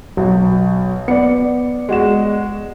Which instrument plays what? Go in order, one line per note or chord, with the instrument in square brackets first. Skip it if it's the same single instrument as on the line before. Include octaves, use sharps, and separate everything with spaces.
[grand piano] B1 [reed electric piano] F#3
[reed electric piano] B3 D5 [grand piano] C#7
[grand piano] G#3 F#4 E7